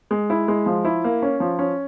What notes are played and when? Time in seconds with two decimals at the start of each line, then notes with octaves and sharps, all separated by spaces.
0.11 G#3
0.30 E4
0.48 G#3
0.66 F3
0.85 E4
1.04 A#3
1.22 C#4
1.40 F3
1.59 C#4